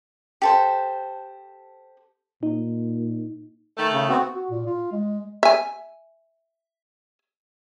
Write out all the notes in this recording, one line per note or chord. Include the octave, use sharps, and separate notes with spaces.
G4 A4 C5
A#2 D#4
D#3 A3
C#3
B3 C4 F#4
F#4
A#2
F4
G#3
E5 G#5